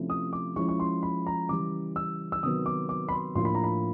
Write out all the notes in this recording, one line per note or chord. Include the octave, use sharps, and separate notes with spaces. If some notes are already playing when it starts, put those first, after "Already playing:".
Already playing: C3 F3 A3 C#4 E4
D#6
D6
F3 G#3 C#4 E4 C#6
C#6
C6
B5
A#5
C#3 E3 G3 D6
E6
E6
C3 D#3 F#3 B3 D#6
D6
D6
B5
C6
A2 F3 A#3 D4 F4 C6
B5
A#5
B5